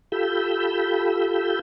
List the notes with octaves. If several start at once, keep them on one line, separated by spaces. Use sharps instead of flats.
F4 G4 A4 B5 E6 G6